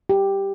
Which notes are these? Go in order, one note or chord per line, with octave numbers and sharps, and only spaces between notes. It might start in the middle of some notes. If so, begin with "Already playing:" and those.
G4